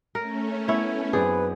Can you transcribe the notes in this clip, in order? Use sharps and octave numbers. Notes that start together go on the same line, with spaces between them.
A3 C#4 A#4
B3 E4 C#5
F#2 C4 D4 G#4 B4